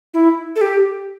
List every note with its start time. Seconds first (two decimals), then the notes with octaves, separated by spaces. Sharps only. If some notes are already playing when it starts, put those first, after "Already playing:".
0.14 E4
0.56 A4
0.61 G4